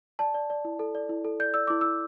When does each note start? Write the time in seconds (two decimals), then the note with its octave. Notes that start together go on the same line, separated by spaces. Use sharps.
0.19 D5 A5
0.34 D5
0.50 D5
0.65 E4
0.79 A4
0.95 D5
1.09 E4
1.25 A4
1.40 D5 G6
1.54 D5 E6
1.67 E4 D6
1.81 E4 E6